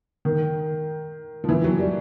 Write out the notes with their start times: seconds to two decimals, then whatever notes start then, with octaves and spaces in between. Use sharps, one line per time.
0.25 D#3
1.44 F3
1.49 E3
1.64 F#3
1.79 G3